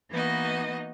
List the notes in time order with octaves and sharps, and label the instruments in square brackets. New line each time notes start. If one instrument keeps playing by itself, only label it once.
[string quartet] E3 A#3 B3 D#4 F#4 D#5